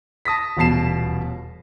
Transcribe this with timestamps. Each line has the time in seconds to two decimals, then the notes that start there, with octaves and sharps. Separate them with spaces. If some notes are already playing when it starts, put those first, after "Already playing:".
0.25 A5 D#6 A#6 B6
0.57 D#1 E2 B2 A5 C7 E7